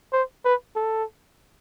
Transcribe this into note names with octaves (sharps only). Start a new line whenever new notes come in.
C5
B4
A4